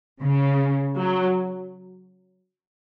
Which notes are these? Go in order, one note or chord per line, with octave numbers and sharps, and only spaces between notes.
C#3
F#3